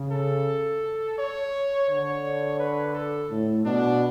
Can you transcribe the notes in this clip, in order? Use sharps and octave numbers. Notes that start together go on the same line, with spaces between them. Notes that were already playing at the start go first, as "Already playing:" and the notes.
Already playing: C#3
A4
C#5
D3 C#5
B4
A4
A2
B2 D4